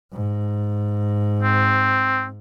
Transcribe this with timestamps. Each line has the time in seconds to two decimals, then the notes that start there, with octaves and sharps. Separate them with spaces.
0.13 G#2
1.42 C4